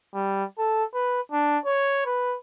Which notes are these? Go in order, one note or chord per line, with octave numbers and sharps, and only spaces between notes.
G3
A4
B4
D4
C#5
B4